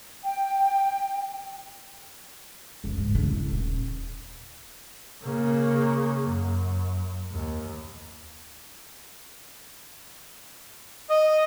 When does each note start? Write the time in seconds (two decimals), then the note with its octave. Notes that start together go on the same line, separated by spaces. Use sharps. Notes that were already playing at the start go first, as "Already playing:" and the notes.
0.24 G5
2.84 F#1
2.98 G#2
3.15 D3
3.28 E4
3.49 D#1
5.23 C#3 A#3
6.27 F#2
7.32 D#2
11.10 D#5